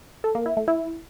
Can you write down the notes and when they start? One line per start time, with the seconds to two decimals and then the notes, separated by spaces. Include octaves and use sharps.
0.24 A4
0.35 A#3
0.46 E4
0.57 A3
0.68 E4